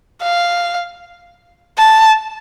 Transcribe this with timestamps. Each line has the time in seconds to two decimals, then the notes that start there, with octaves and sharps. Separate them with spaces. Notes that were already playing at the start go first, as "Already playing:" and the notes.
0.23 F5
1.78 A5